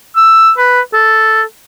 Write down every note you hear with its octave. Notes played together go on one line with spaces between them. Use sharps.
E6
B4
A4